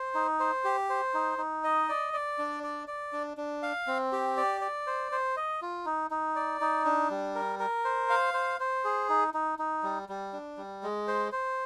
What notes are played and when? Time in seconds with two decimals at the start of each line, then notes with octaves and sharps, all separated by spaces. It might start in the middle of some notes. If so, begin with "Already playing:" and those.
Already playing: C5
0.15 D#4
0.40 C5
0.64 G4
0.89 C5
1.14 D#4
1.38 D#4
1.64 D#5
1.89 D5
2.13 D5
2.38 D4
2.63 D5
2.87 D5
3.13 D4
3.37 D4
3.62 F5
3.87 C4
4.12 G4
4.37 D5
4.61 D5
4.87 C5
5.12 C5
5.36 D#5
5.62 F4
5.85 D#4
6.11 D#4
6.36 D5
6.61 D#4
6.85 D4
7.10 G3
7.35 A#4
7.59 A#4
7.85 C5
8.10 F5
8.34 C5
8.60 C5
8.84 G#4
9.09 D#4
9.34 D#4
9.59 D#4
9.83 G3
10.09 G3
10.33 D4
10.57 G3
10.83 G#3
11.07 C5
11.32 C5